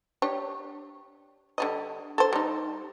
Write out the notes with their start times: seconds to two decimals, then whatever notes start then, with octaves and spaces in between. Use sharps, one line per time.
0.22 D4 G4 C#5
1.58 D3 G3 D#5
2.18 A4 C5
2.33 G3 D#4